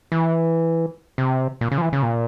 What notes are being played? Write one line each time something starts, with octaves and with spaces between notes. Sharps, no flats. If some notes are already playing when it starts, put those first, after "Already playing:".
E3
C3
A#2
C#3
F3
E3
C#3
A#2